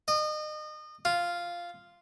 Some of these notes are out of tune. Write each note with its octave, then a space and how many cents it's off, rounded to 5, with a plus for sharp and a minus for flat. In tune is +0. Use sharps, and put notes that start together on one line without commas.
D#5 -30
F4 -5